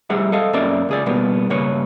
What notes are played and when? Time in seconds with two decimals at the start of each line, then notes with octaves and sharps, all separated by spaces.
0.10 A2 G3 G#4 E5 F#5
0.32 A4 D#5 F5
0.53 F#2 A#3 C#4 A#4 D5 E5
0.89 C#2 G#4 D5
1.06 B2 G3 A#3 B3
1.50 G2 C#3 A#3 B4 C#5